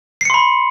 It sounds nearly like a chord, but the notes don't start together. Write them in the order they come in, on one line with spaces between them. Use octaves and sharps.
C7 C#7 C6 B5